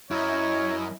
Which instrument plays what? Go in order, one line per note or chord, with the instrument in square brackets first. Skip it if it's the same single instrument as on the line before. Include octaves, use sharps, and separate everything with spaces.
[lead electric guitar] F#2 [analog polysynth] E4 D#5 [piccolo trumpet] C#5